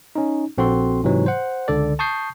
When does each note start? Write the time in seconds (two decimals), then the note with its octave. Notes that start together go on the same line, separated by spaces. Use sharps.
0.15 C#4 D#4
0.58 A#1 C4 F#4 A4 C6
1.03 G#2 C3 E3 F#3
1.26 C5 F#5
1.68 C#2 D3 A4 D5
1.99 A5 C#6 D#6 G6 C7